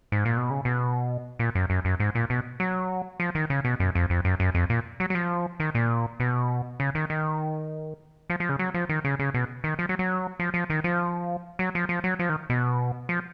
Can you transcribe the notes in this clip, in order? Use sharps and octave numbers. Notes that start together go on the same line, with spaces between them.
G#2
A#2
B2
C#3
B2
A#2
F#2
F#2
F#2
G#2
A#2
B2
F#3
F3
D#3
C#3
B2
F#2
F2
F2
F#2
F#2
F2
A#2
F#3
F#3
F3
D#3
A#2
B2
C#3
D#3
D#3
F3
F3
C#3
F#3
F3
D#3
C#3
C#3
B2
D#3
F3
F#3
F#3
F3
F3
D#3
F3
F#3
F3
F3
F#3
F3
D#3
B2
F3